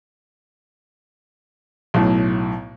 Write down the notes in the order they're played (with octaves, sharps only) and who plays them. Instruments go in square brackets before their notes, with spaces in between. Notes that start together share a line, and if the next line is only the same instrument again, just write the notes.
[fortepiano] B1 A2